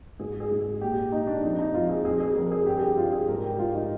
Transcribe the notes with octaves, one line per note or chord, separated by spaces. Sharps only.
G#2 G#4
G#4
G#2
G#4
A#2 G4
A#2 D#4
D4
F2 D#4
D#4
F2 F4
G#4
F2 G#4
G#4
F2 A#4
G#4
G2 G4
G#4
G4
G2 F4
G#4
G#2 A#4
G4
G#2 F4
D#4